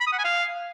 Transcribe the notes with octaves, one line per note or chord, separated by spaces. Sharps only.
B5
D#6
F#5
G#5
F5